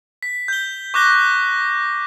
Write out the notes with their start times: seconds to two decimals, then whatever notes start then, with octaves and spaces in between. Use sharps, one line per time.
0.23 B6
0.48 G6 G7
0.94 C#6 D6 F#6 A#6 G7